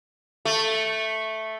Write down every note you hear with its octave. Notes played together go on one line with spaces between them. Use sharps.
A3